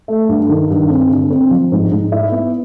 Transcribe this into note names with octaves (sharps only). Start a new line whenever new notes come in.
A3
G2
D#3
G2
C4
D3
C4
F3
G#2
G#2
E4
B3